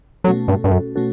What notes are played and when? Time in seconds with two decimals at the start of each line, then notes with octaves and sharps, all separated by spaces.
0.24 B2 F#3 A3 C#4 F#4 A4
0.48 G2
0.64 G2
0.71 F#2
0.96 B2 A3 C#4 F#4 A4